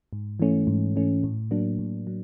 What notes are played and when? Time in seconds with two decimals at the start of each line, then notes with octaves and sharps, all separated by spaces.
0.13 G#2
0.40 E3 A3 C#4
0.67 G#2
0.96 E3 A3 C#4
1.24 A2
1.51 F#3 A#3 D4
1.79 A2
2.07 F#3